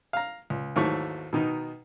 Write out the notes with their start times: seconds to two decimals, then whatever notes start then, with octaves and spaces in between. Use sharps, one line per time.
0.13 F5 A#5
0.50 C#2
0.76 D#2 G#2 E3 F#3 A3 C#6
1.33 B2 D#3 D#4